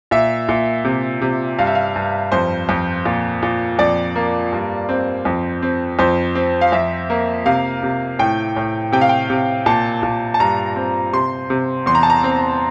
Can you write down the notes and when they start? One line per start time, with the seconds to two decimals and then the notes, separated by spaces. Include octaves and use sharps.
0.11 A#2 E5
0.49 A#2
0.84 C3
1.21 C3
1.59 G2 F5
1.67 E5
1.75 F5
1.96 G2
2.32 F2 C5
2.69 F2
3.05 A#2
3.43 A#2
3.79 F2 D5
4.15 A#3
4.52 G2
4.89 C4
5.25 F2
5.62 C4
5.99 F2 C5
6.35 C4
6.61 F5
6.72 F2 E5
7.10 A#3
7.46 C3 F5
7.83 C3
8.19 A2 G5
8.56 A2
8.92 C3 G5
9.01 F5
9.09 G5
9.30 C3
9.66 A#2 A5
10.03 A#2
10.34 A5
10.40 G2 A#5
10.76 C4
11.13 C3 C6
11.50 C3
11.86 E2 C6
11.95 A#5
12.03 A5
12.10 A#5
12.23 C4